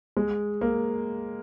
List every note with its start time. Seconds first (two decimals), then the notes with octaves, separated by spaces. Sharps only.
0.17 G#3
0.61 A#3